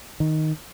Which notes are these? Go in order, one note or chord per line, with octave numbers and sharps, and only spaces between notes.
D#3